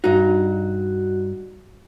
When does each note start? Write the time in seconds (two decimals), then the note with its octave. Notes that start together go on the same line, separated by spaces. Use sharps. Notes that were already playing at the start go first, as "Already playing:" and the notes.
0.04 G2 D#4 F#4